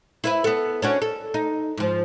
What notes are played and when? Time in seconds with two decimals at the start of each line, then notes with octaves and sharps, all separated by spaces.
0.24 E4 B4 E5
0.44 B3 A4
0.82 C#4 D4 F#4
1.02 A4
1.34 D#4
1.77 G#2 F3